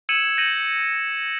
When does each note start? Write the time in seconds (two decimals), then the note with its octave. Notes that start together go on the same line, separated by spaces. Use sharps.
0.09 E6 G#6 C#7 D#7 E7 F#7
0.38 G6 A#6 C#7 D#7 F#7